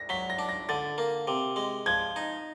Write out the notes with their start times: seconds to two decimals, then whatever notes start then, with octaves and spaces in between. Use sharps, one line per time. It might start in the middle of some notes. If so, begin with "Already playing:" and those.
Already playing: A#6
0.09 F#3 B6
0.30 A#6
0.39 D4
0.49 A#6
0.69 D3 A6
0.98 A#3
1.28 C3
1.56 G#3
1.86 F3 G#6
2.16 D#4